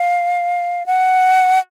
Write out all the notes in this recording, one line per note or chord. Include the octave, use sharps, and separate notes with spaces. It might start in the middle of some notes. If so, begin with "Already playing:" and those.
Already playing: F5
F#5